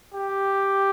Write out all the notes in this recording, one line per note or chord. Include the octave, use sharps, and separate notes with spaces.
G4